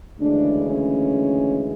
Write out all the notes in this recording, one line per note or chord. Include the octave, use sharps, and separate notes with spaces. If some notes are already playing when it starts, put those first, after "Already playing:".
D2 C#3 E3 G#3 D4
C#4